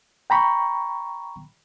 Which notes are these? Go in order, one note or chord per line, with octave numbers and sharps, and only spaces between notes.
G5 A#5 B5 C#6